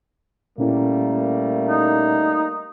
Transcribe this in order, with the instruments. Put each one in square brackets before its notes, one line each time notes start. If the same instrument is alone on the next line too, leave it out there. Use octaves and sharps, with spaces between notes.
[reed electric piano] A#2 C#4 E4 [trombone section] G3 A3 A#3
[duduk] D#4